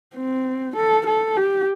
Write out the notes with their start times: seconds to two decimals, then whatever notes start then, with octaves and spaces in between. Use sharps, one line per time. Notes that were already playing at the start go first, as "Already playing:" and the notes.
0.16 C4
0.76 A4
1.06 A4
1.37 G4